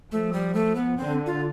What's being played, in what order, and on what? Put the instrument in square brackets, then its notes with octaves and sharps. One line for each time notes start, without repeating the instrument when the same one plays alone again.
[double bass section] F3 [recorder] A3
[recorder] G3
A3
B3
[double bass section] D3 [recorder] C4
[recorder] F4